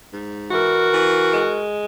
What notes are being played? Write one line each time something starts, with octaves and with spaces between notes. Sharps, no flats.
G#2
E3 F#4 A#4
E3
G#3